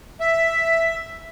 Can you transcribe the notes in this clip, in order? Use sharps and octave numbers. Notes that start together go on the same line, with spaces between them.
E5